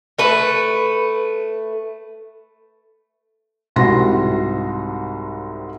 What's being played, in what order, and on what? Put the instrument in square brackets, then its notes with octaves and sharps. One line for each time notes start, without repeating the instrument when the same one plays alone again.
[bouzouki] A3 B4
[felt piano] C2 G#2 C3 F#4 C6 A#6